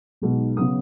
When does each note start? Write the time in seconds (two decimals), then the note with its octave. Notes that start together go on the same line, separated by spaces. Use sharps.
0.22 B1 B2 G#3 B3 D#4
0.57 C#3 F#3 B3 D#6